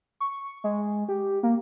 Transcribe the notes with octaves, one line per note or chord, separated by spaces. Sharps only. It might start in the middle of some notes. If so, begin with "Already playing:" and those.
C#6
G#3
G4
A#3